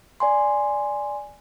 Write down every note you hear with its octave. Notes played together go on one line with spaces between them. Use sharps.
D5 G#5 C6